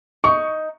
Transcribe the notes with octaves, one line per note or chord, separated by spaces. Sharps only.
D#4 C#6